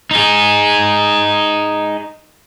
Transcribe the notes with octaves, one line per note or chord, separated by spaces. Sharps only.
D#4 G#4